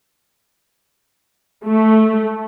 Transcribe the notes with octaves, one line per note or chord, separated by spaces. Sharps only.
A3